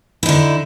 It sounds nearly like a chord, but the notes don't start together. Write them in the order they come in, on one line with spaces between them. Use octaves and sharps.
E4 D#4 D3